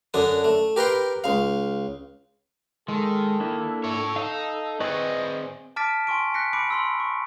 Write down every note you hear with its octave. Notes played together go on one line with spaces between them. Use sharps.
F#2 D3 D4 D#6
A3
G4 A#4 B4 G5 C6
C#2 F5
D#3 G#3 A4
A#3 D4 E4
C#5 E5
D#4 F5 E6
C4 G#4 B4 D5 D#5 C#6
A5 D6 F6 A6 B6 D7
G#5 C6 C#6 D7
F#6 A#6 B6 C#7
B5 D6 F#6 C#7 D7
B5 C6 E6
C#6